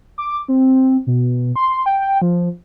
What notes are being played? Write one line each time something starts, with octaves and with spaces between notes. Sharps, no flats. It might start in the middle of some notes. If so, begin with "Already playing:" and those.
D6
C4
B2
C6
G5
F3